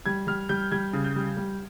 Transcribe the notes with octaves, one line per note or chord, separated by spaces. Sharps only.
G3 G#6
G3 F6
G3 G6
G3 G#6
C#3
G6
G3
G3